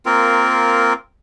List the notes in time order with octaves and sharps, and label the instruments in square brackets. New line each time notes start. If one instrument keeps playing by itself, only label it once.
[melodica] A#3 C4 F4 A#4